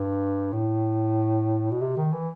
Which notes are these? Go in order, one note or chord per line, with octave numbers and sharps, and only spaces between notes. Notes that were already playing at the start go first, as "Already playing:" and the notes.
Already playing: G2
A2
B2
C3
D#3
E3